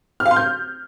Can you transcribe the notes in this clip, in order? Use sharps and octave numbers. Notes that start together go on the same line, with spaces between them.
F6
F5
C6
G6